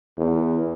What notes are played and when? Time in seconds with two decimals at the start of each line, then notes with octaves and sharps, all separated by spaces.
0.18 E2